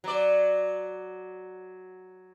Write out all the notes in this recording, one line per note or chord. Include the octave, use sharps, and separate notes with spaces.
F#3 D5